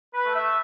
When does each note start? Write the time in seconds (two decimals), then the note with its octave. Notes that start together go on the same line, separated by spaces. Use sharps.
0.14 B4
0.25 A3
0.35 E5